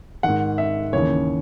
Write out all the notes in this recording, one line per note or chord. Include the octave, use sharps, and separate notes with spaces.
G#2 D#3 F#5
E5
D#2 C#3 E3 C#5